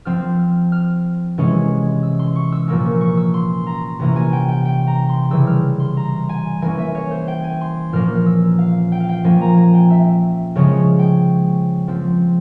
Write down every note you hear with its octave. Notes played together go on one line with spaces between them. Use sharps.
F3 C4 F6
F6
F6
C3 E3 G#3 C#4
E6
C6
C#6
E6
A#2 F3 A#3 C#4 E6
C#6
C#6
E6
C6
A#5
C3 E3 A#3 C#4 A#5
G#5
G5
G5
G5
A#5
C6
C#3 E3 G3 E6
F6
C6
A#5
G#5
E3 A#3 C#4 G#5
E5
C#5
C5
G5
G#5
C6
A#2 F3 A#3 C#4 F6
F6
E6
F5
G5
F5
G5
F3 A#3 C#4 G#5
A#5
G#5
G5
E5
C#3 F3 G#3 C#4 C#5
G5
F3 C4